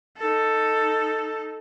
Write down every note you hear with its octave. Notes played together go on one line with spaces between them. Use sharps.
D#4 A4